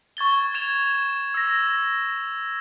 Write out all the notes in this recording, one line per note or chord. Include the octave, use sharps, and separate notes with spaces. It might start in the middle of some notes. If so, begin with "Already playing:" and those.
C#6 G#6 A6 G7
G#6 E7 F7
E6 A#6